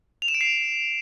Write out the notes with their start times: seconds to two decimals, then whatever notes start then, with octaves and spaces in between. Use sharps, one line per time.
0.22 F7
0.28 E7
0.34 D7
0.41 C7